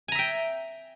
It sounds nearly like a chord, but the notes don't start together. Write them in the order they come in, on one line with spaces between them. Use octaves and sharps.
G#5 A#5 E5 G5